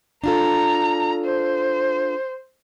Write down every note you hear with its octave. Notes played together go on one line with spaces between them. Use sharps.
D4 F4 A4 A#5
C5